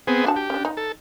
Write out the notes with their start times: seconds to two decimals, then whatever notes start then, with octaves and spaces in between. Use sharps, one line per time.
0.07 B3 C4 G#4
0.24 D4 F#4 A5
0.36 G4
0.50 C#4 D4
0.65 D#4
0.77 A4